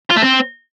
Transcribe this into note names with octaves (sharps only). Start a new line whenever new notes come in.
F4
A3
C4